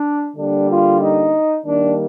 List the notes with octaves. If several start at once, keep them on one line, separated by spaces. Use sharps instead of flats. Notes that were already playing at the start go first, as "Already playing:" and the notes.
Already playing: D4
D3 G3 A#3 D4
F4
D#4
D#3 G3 A#3 D4